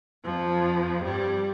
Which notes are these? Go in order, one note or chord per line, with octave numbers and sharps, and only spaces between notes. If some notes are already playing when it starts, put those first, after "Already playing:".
F2 F3
G2 G3